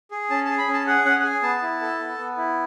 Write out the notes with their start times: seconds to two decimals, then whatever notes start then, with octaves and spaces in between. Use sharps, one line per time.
0.11 G#4
0.30 C#4 A5
0.45 G#4 A5
0.58 B5
0.68 C#4
0.73 A5
0.87 G#4 F#5
1.05 C#4 F#5
1.19 F#5
1.24 G#4 G#5
1.43 B3 A5
1.62 E4
1.81 A4
1.99 B3
2.18 B3
2.37 E4